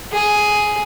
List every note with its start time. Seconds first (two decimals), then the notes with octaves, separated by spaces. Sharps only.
0.12 G#4